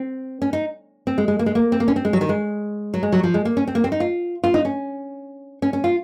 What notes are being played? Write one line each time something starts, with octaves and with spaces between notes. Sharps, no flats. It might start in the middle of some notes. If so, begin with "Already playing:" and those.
Already playing: C4
C#4
D#4
C4
G#3
G#3
A#3
G#3
A#3
C4
A#3
C#4
C4
G#3
F#3
D#3
G#3
F#3
G#3
F#3
F3
G#3
A#3
C#4
C4
A#3
C4
D#4
F4
F4
D#4
C#4
C#4
C#4
F4